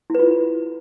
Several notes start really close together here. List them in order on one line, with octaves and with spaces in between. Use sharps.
E4 B4 F4